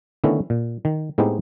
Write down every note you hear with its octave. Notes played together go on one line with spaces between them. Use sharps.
D3 D#3 A3 B3 C#4 E4
A#2
D#3
A2 G#3 B3 C4 D#4 G4